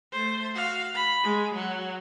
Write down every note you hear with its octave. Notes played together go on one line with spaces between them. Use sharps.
A3 C5
F#4 F5
B5
G#3
F#3